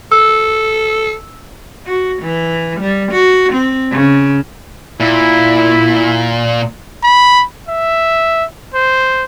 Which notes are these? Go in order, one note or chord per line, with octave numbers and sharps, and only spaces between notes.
A4 E6
F#4
E3
G3
F#4
C4
C#3
A#2 E4
B5
E5
C5